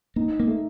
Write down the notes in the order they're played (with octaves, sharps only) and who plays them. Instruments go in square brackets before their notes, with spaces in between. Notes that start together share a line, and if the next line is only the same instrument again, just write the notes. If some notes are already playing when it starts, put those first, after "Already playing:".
[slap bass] A#3 [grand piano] D#4
[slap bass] A#3
[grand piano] A3